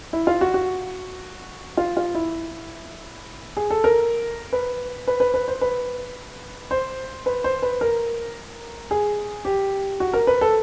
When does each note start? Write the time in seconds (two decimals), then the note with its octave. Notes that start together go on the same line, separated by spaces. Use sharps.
0.13 E4
0.27 F4
0.41 F#4
0.54 F#4
1.77 F4
1.97 F4
2.15 E4
3.57 G#4
3.70 A4
3.84 A#4
4.53 B4
5.08 B4
5.20 B4
5.34 B4
5.48 C5
5.61 B4
6.71 C5
7.26 B4
7.44 C5
7.62 B4
7.81 A#4
8.91 G#4
9.45 G4
10.00 F#4
10.13 A#4
10.27 B4
10.41 A4